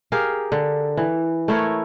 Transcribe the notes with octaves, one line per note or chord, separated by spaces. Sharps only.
G4 G#4 A#4 F5
D3
E3
A3 E4 A#4 C#5